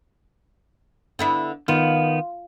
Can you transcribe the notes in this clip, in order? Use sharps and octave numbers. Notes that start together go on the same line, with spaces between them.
D3 B3 E4
D#3 B3 F4